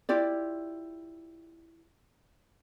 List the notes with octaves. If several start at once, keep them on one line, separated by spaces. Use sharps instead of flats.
E4 F4 G4 D5